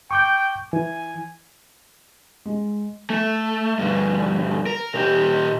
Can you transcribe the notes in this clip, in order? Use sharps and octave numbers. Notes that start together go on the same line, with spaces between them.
G5 C#6 D6 G6
E3 G#5
G#3
A3
D2 G2
A#4
A#2 G4